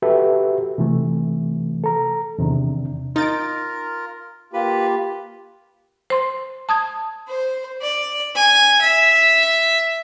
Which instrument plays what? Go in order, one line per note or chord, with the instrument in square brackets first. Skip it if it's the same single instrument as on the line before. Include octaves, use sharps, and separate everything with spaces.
[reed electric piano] F#4 G4 A4 B4 E5
C3 E3 A3
A4 A#5
E2 C3 D#3 D4
[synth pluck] D#4 A6 D7 [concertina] F4 A#4
[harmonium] A#3 F4 G4 [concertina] B4
[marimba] C5 C6
A5 D#6 G#6
[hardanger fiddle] C5
D5
G#5
E5